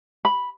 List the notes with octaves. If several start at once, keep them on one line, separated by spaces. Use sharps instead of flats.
B5